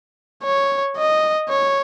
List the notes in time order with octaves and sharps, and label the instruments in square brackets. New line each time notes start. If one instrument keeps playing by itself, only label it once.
[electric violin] C#5
D#5
C#5